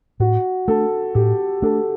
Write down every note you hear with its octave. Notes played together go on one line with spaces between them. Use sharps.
A2 F#4
A3 D4 A4
A2 G4
A3 D4 A4